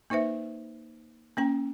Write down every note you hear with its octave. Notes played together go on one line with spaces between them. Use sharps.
A#3 D#4 B4 C5 E5
A#3 C#4 G5